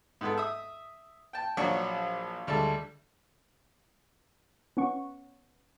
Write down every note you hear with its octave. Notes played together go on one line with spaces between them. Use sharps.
G#2 B3 A4
E5 D#6
G5 A5
A#1 F#3 D4 C#6
D2 G3 G#3 A4 A5
B3 C#4 F#5 C#6